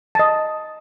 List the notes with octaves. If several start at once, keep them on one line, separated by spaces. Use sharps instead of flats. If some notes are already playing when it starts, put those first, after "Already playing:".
D#5 A5